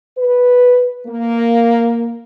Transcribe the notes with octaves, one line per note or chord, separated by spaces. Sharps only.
B4
A#3